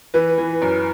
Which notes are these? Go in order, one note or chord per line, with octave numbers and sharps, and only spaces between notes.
E3 B4
E3
F#2